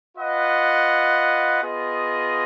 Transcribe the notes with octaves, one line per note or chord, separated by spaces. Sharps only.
F4 B4 D#5 F#5
B3 F4 G#4 D#5